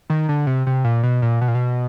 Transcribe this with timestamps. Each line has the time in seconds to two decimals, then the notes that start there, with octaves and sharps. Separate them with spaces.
0.10 D#3
0.29 D3
0.47 C3
0.67 C3
0.84 A#2
1.03 B2
1.22 A#2
1.41 B2
1.48 A#2
1.55 B2